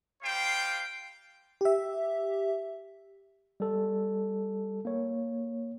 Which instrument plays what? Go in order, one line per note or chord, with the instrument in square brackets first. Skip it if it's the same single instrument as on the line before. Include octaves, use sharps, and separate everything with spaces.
[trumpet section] G3 C5 F5 G5
[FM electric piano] G4 E5
[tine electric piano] G3 A4
A#3 C#5